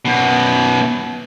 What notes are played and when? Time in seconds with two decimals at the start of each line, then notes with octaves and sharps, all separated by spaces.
0.05 F#2 B2